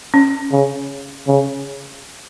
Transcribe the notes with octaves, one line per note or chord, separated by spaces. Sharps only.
C#4
C#3
C#3